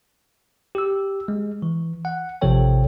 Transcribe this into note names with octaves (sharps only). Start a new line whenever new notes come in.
G4 E6
G#3
E3
F#5
A1 C3 F3 A4 C#5 G5